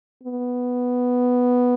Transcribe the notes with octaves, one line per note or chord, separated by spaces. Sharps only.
B3